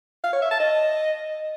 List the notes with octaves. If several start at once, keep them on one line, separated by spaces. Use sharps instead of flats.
F5
C#5
E5
A5
D#5